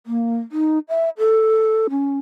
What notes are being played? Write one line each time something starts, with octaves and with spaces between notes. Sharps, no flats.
A#3
D#4
E5
A4
C#4